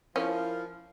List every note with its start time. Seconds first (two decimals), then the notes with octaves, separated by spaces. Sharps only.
0.16 F3 C#4 E4 A#4